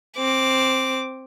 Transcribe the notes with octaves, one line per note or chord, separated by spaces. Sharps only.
C4 D6